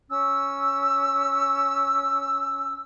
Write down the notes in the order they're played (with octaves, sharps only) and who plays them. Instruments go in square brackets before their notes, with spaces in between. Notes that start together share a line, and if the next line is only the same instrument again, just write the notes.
[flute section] C#4 E6